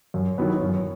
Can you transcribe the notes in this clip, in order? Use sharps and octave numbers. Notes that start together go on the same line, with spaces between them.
F#2
D#3 F#3 B3
F#2